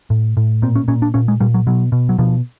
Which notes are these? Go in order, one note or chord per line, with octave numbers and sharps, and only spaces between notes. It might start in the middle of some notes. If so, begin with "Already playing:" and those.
A2
A2
A#2 C4
C#4
A#2 C#4
D4
A#2 C#4
G#3
A#2 G3
F#3
B2 F#3
B2
F#3
B2 F3